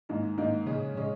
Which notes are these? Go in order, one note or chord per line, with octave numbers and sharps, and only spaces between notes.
G#2 D#3 A#3 D#4
G#2 D#3 A#3 D#4
C#3 G#3 C#4 G#4
C#3 G#3 C#4 G#4